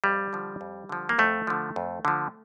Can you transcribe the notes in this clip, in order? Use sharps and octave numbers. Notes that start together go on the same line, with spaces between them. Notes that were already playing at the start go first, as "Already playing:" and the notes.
F2 G3
D3 F3
F2
D3 F3
A#3
F2 A3
D3 F3
F2
D3 F3